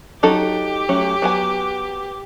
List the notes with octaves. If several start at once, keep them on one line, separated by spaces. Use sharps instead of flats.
F#3 D#4 G4 A4
F#3 A3 C#4
F#3 B3 G#5